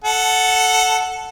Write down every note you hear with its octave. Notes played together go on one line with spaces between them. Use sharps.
A4 F#5